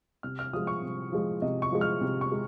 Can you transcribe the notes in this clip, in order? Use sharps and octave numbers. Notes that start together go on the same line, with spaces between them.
C3 F6
F6
F3 G#3 D#6
C#6
C3
F3 G#3
C3 D#5
C#6
F3 G#3
F6
C3
C#6
G#3